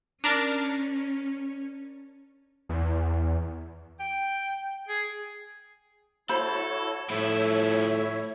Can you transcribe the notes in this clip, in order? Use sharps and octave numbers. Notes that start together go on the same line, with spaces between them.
C#4 D4 A#4 A6
E2
G5
G#4
E4 F#4 A4 C5 C#5 B5
A2 F3 E4 C#5 E5